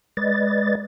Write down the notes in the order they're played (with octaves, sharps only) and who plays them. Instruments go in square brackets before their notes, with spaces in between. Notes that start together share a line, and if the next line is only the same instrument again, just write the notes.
[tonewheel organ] G#3 B4 D5 D#5 A6